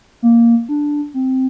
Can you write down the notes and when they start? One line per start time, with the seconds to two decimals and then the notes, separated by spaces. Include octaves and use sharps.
0.22 A#3
0.69 D4
1.14 C4